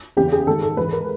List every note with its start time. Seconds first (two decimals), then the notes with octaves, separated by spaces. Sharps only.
0.17 E2 C#3 E3 G4
0.32 G#4
0.47 G#2 D#3 A4
0.63 A4
0.77 G#2 E3 B4
0.93 A#4